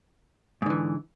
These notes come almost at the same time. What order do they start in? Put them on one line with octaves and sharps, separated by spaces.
G#2 D3 E3